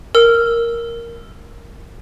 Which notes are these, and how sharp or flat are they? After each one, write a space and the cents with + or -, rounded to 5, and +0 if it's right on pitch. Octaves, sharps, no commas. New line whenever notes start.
A#4 +0 E6 +0